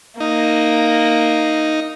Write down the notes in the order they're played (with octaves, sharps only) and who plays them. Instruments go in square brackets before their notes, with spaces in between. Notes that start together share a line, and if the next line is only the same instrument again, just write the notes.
[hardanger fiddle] A#3 [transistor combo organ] D#4